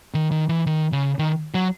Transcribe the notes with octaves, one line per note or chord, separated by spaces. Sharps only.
D#3
D#3
E3
D#3
C#3
D#3
F#3